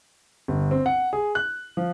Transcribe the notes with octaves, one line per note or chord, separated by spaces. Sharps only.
G1
C4
F#5
G#4
F#6
F3